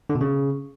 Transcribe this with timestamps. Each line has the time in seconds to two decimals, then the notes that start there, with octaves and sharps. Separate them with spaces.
0.10 D3
0.15 B2
0.21 C#3